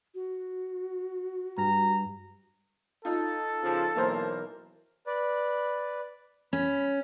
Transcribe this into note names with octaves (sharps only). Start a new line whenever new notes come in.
F#4
G2 A#5
D#4 F4 A4
C#3 F3
B1 E3 A#3 A#4 C5
B4 D5
C#4 B5